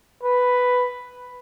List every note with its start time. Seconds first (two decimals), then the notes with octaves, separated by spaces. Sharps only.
0.23 B4